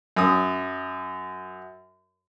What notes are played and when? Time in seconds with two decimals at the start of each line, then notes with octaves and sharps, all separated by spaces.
0.16 F#2 D#6